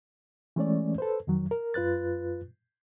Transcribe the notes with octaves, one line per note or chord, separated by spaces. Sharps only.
E3 G#3 A3 C#4 C#5 D5
A4 B4 C5
F2 D#3 F#3
A#4
F#2 F4 B4 F#6 A6